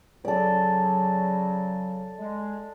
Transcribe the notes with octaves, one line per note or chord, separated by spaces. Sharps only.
C#3 F#3 A4 D5
G#3